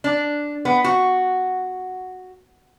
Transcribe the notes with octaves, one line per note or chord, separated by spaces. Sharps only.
D4
B3
F#4